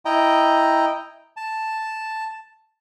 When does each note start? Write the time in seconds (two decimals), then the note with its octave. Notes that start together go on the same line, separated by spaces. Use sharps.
0.05 E4 D#5 G5 A#5
1.37 A5